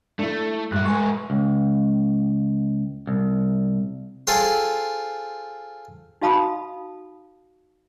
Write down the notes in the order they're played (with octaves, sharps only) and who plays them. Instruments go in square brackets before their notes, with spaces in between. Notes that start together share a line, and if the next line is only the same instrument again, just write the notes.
[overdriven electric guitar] A3 [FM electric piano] D4 E4
[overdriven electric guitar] G2 E5 [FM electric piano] F#6
[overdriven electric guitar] G#3 B3 [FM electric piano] G#5 C#6
[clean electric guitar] C#2
C2
[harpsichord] F4 G#4 A4 C5 G5 C6
[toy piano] D#4 F#4 F5 A5 B5 D#6